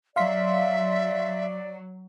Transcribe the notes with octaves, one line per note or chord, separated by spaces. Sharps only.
F#3 D5 E5 F5 C6 B6